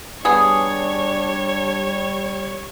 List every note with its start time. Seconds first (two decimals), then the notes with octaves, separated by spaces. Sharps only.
0.25 G3 B3 D4 G#4 C#5